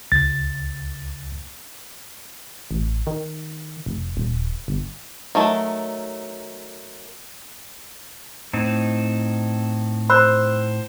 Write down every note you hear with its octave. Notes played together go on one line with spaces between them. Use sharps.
C#2 A6
A1
D#3
F1
D#1
G1
D#3 F#3 A3
A2 C4 D#4
C5 B5 E6 F#6